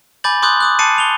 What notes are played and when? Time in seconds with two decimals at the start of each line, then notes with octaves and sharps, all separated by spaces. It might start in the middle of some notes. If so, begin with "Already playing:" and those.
0.24 G#5 B5 D6 G6 A6 F#7
0.42 C6 D6 D#6 F#6 G6 F#7
0.60 D6 D#6 F#6
0.79 A5 D6 A6 C7 C#7 D#7
0.96 D6 F7 G7